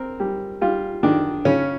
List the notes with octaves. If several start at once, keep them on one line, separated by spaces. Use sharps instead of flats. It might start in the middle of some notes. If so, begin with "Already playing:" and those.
Already playing: C4 A#4
G3
G3 F4
D#3 D4
C#3 C#4